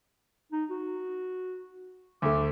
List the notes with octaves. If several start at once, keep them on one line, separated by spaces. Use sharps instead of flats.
D#4
F#4
D2 A3 D6